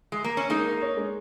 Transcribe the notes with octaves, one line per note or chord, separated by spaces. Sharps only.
G#3
A#3
C#4
G#3 A#3 D#4
A#4
C#5
G#3